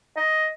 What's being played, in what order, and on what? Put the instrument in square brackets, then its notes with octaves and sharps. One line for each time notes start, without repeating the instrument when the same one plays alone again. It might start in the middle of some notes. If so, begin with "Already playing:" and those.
[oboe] D#5